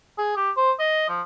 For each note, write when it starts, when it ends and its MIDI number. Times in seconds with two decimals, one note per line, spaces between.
0.18 0.33 68
0.36 0.51 67
0.57 0.72 72
0.79 1.08 75
1.09 1.22 53